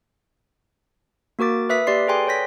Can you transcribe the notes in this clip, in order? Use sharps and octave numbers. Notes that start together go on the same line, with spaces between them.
A#3 F#4 A#4 D6 A6
B4 E5 D#6 B6
A#3 G4 D5 C6 C7
G#4 A4 B4 G5 G#5 C6
C#5 D5 G6 A#6 B6